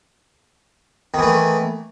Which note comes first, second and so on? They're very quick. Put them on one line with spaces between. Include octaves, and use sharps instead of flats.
D#3 E3 A3